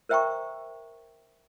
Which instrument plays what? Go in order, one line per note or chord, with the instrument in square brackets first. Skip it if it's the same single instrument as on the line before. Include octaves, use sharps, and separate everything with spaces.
[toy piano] A#4 C5 E5 G5 A#5 C#6